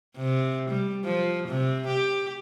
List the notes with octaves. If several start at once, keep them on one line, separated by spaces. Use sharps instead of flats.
C3
G3
F3
C3
G4